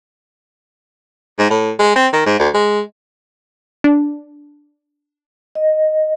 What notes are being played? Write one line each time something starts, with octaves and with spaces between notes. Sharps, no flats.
G#2
A2
G#3
C4
D#3
G#2
D2
G#3
D4
D#5